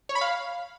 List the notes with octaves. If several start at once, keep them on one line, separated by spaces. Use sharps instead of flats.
C#5
B5
F5